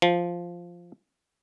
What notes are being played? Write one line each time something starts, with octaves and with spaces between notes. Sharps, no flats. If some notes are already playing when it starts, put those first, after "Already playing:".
F3